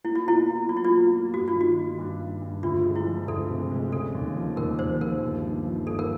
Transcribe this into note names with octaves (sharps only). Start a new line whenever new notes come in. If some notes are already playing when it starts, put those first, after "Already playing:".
A#3 E4
F4
B2 E4
B2
F#3 F4
E4
F4
A#3
A#3
G2 F#4
F4
D#3
F#4
D#3
G2
G2
G2
D2 F4
G#3
E4
F3
D2 A4
C3
G#3
C#3 A4
D#2
F3
D#2 A#4
D#2 C5
F3 A#4
G1
G2
F3
G2 A4
A#4